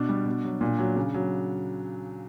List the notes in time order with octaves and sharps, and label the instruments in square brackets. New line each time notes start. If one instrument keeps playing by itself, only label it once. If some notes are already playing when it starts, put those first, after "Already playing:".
Already playing: [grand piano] B2 D4
G3
B2
F#3
A#2 D4
F#3
C#3
F#3